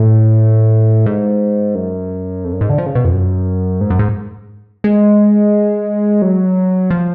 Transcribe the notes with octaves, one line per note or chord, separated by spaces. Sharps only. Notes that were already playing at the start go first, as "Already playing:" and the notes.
Already playing: A2
G#2
F#2
F2
F#2
G#2
D3
F3
C#3
B2
F2
F#2
G#2
F#2
G#2
G#3
F#3
F3